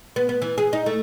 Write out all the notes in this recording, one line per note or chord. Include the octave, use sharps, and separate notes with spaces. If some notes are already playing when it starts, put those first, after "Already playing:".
B3
B3
E3
G#4
D#4
A3